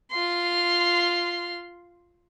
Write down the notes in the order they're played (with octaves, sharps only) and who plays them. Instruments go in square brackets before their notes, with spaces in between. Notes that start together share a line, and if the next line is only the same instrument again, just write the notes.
[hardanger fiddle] F4 C6